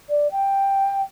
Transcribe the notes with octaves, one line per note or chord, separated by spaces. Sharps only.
D5
G5